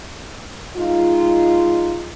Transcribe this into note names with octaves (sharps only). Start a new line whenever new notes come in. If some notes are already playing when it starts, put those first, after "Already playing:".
G#3 D#4 F4